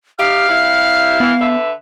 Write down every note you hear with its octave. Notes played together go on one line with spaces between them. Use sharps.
D#4 E4 G4 F5 F6
C3 G3 E4
E3 B3
D3 B4 E5